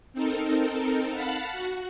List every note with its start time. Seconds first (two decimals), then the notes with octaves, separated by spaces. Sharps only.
0.13 C4 D#4 A4 A#4
1.11 F5 F#5 A5 B5
1.53 F#4